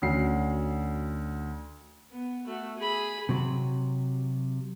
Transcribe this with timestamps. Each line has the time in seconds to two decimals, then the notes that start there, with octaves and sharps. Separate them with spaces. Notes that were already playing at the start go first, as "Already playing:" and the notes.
0.02 D2 C#4 F#4 C7
2.11 B3
2.46 A3 F#4
2.77 G#4 B5
3.29 C3 F#3